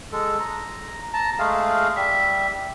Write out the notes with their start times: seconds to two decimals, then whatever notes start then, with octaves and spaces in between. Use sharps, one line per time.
0.12 G#3 A4
0.40 A#5
1.14 A5 A#5
1.39 G#3 A3 G#4 F5
1.96 G3 E5